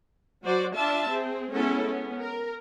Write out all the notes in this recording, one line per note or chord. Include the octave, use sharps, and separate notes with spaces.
F#3 F#4 C5 D5
D4 F4 E5 A5
C4 G#4
G#3 B3 C#4 E4 A4
B3 C#4
A#4